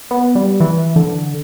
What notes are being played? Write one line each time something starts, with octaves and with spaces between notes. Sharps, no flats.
B3
G3
E3
D3